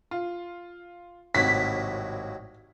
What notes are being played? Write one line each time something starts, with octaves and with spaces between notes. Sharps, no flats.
F4
G#1 D#2 A2 C3 F#3 B6